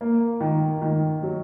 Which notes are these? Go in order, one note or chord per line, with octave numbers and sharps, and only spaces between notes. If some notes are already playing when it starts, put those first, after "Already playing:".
A#3
D#3
D#3
F#3